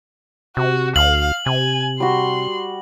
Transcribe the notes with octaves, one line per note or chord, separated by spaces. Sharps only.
C3 F#4
D2 F5 F#7
C3 G#5
G3 F#4 C6